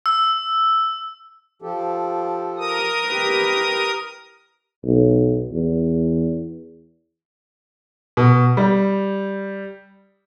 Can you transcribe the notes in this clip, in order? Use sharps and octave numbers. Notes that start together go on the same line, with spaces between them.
E6
F3 G4 A4
A#4 D#6
E4 G4 B4
B1
E2
B2
G3